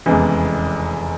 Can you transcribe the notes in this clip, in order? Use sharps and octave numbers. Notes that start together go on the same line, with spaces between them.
F1 E2 C#3 E3 G#3